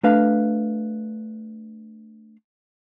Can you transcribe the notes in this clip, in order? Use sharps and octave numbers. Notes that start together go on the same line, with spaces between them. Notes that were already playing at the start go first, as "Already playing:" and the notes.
A3 D4 B4 F5